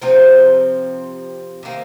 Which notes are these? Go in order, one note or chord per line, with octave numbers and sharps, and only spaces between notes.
C3 F3 C4 D#4
C3 D#3 A#3